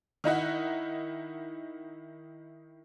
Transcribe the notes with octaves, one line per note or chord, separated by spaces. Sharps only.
D#3 D#4 E4 F#5